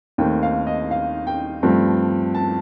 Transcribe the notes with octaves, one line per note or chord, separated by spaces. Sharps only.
D#2 D#3 A3 C4 G5
F5
D#5
F5
G5
G2 F3 A3 C4
A5